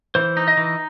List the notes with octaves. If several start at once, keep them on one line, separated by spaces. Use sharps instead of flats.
E3 C5
D#4
D#5
E3